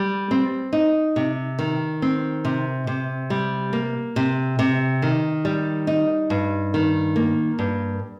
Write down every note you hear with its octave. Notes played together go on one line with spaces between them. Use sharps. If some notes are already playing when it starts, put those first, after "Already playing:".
Already playing: G3
C4
D#4
C3
D#3
C4
C3
C3
G3
A#3
C3
C3
D#3
G3
D#4
G2
D#3
A#3
G2